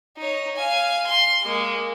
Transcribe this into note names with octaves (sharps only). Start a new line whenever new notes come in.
D#4 C#5
F5 G#5
C6
G#3 A#3